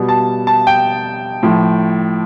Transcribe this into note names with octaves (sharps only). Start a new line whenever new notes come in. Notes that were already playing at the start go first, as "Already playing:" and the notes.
Already playing: B2 G3
A5
A5
G5
A2 F3